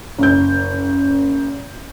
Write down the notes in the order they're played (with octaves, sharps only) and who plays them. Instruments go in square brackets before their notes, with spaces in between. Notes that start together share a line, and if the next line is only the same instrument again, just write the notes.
[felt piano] F#1 G6